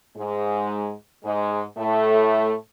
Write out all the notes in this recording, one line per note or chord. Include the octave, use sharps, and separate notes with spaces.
G#2 G#3
G#2 G#3
A2 A3